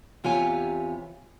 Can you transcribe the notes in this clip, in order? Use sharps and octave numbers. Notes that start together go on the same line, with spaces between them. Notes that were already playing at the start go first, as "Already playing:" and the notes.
E2 C3 F4 G4 C#5 G#5